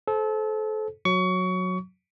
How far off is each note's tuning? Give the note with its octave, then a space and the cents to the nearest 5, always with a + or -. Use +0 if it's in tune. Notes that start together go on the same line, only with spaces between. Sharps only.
A4 -30 C5 +0
F#3 -10 C#6 +25